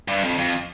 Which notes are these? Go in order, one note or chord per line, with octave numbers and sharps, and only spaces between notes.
G2
F2
F2